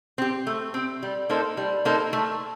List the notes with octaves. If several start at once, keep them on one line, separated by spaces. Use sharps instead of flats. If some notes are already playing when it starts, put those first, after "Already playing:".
C4 G4
A3
C4 G4
G3
A#3 D#4 A4 C5
G3
A#3 D#4 A4 C5
A3